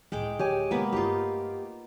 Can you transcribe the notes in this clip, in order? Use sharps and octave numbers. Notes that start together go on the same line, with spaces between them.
C#2 A2 G#3 G5 D6
D2 G4 C#5 G#5
C3 G#3 A#3 B3 B4
G2 A3 D#4 F4 G4